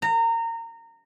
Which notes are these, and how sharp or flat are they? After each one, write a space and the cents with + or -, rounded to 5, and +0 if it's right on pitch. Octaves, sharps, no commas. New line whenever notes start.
A#5 -25